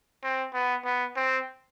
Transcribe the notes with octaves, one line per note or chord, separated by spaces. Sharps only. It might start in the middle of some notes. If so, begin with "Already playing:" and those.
C4
B3
B3
C4